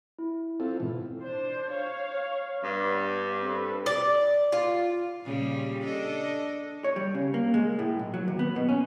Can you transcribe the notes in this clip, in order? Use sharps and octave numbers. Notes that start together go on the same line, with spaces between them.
E4
C4 F4 A4
G#2 B2 E3
D4 C5
C#5 F5
G2 B3
C4 A4 B4
D5
F4
A#2 C#3 G3
D4 A4 D#5
C#5
G3
C#3
A#3
G#3
A2
B1
F#3
D#2
B3
B2
C#4